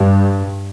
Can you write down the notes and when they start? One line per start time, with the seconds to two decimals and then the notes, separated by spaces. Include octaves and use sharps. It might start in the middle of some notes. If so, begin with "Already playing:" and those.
Already playing: G2